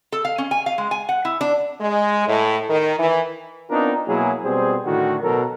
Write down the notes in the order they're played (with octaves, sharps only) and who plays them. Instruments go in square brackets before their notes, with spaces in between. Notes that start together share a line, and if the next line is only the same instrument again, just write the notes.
[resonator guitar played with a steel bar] A4
F5
C#4
G#5
F5
G#3
G#5
F#5
E4
D4
[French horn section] G#3
A2
D#3
E3
[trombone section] B3 C4 D4 D#4 F4 A#4
B2 F#3 A#3 E4 G#4
B2 G3 C4 G#4 C5
A2 D3 D#3 F#4
B2 F#3 A4 A#4